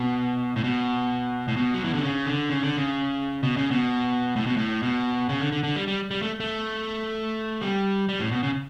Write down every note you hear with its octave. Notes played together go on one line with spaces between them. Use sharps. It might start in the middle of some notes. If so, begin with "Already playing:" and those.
Already playing: B2
A2
B2
A2
B2
F#3
E3
D3
C#3
D3
C#3
D3
C#3
B2
C#3
B2
A2
B2
A2
B2
C#3
D3
D3
D3
G3
G3
G3
A3
A3
G3
G3
A2
B2
C#3